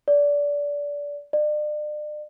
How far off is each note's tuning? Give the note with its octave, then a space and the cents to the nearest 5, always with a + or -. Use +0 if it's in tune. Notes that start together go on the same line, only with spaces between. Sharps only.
D5 -25
D5 +40